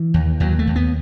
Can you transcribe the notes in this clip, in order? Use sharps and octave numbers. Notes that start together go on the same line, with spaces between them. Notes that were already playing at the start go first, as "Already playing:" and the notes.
Already playing: E3
D#2
D#2 F#3
A3
D#2
B3